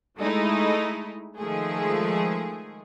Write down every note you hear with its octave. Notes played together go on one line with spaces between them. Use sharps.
G#3 A3 D#4 E4
D#3 F3 G#3 A3 G#4